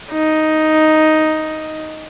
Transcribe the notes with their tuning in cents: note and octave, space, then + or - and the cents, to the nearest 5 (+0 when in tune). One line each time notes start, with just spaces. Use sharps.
D#4 +5